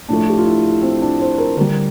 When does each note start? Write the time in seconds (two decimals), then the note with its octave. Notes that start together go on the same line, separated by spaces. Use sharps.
0.09 A2 F3 A3 D4
0.29 G4
0.38 F4
0.45 E4
0.82 C4
1.02 D4
1.20 C5
1.38 A#4
1.56 D3 G3 A#4